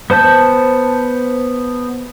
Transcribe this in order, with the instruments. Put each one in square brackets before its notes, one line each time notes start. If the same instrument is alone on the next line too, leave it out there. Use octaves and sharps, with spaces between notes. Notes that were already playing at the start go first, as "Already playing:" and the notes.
[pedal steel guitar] B3 C5 A5 G6